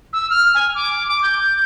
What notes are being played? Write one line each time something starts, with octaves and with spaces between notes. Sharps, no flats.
E6
F6
G#5
D6
D6
G6